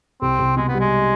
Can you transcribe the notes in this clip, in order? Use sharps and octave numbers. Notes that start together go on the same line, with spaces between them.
C2 C4
C2
B2 G#3
B3
G3
G#3